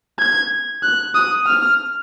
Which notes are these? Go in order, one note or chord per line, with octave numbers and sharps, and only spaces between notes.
G#6
F#6
D#6
F6